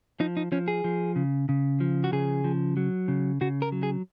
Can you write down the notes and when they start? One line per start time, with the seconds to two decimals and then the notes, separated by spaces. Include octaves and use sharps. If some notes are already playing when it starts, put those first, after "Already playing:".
0.20 F3 D#4
0.37 D#4
0.52 F3 C#4
0.68 G#4
0.84 F3
1.16 C#3
1.49 C#3
1.80 F3
2.04 F#4
2.12 C#3 G#4
2.44 F3
2.77 F#3
3.08 C#3
3.41 C#3 F#4
3.62 A#4
3.72 F#3
3.83 G#4